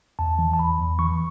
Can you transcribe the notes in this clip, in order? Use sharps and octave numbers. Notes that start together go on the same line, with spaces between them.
E2 A5
E3
A5
E2 B5
E2
E3 C#6